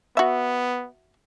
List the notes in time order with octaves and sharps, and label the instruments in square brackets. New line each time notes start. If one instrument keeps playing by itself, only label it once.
[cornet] B3 [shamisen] F#4 E5